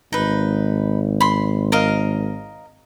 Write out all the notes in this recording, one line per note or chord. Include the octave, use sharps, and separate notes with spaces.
G#1 D#4 B4
B5 C6
A#4 D#5 F5